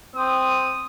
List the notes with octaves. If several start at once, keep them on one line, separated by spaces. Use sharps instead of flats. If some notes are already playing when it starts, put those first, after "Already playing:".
C4 D#6